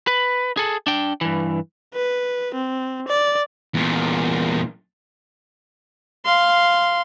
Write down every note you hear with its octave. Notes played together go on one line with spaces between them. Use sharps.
B4
G#4 A4
D4 G5
G2 E3
B4
C4
D5
E2 A#2
F5 C6